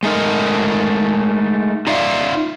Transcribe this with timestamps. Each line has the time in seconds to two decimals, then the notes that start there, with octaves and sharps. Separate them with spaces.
0.03 G#3 A3 D#4 A#4
1.87 D#4 F4 D5 E5 F5